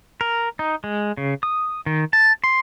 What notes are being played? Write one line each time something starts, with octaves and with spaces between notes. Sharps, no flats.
A#4
D#4
G#3
C#3
D#6
D#3
A5
C6